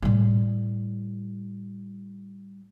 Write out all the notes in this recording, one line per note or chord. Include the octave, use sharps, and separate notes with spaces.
A2 G3